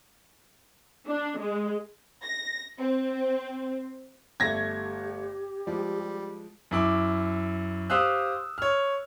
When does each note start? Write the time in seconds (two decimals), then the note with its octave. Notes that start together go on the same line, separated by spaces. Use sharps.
1.08 D4
1.39 G#3
2.23 A#6
2.78 C4
4.40 G1 A3 G4 G#6 A#6
5.67 F3 G3 G#3
6.71 F#2 E4 D6
7.90 G4 C5 F5 D#6 E6 F#6
8.58 C#5 F6